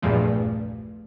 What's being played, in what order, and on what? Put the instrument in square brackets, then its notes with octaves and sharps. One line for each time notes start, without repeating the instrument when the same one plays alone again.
[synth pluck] A#1 E2 G2 A#2 F3 A3